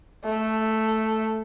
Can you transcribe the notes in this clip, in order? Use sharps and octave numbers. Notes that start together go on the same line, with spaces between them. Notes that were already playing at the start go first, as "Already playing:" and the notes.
A3